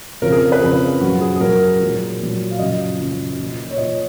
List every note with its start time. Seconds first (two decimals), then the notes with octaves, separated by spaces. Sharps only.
0.22 F2 C#3 F3 A#4
0.32 G#4
0.42 A#4
0.52 B4
0.61 F2 C#3 F3 G#4
1.01 F#2 F3 F#4
1.21 G#4
1.36 G#4
1.40 F#2 F3 A#4
1.80 A#2 F#3
2.19 A#2 F#3
2.51 F5
2.59 F#2 C#3 F3 D#5
2.99 F#2 C#3 F3
3.38 A#2 F3
3.71 C#5
3.78 A#2 F3 D#5